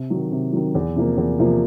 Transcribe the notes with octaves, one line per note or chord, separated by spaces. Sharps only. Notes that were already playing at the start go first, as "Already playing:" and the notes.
Already playing: C3
D#3 F#3
C3
D#3 F#3
E2
C3 F3 A#3
E2
C3 F3 A#3